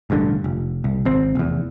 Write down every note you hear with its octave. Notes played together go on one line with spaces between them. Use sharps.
E1 A1 G2 D3
F1
C2
G#1 C4
F1 E2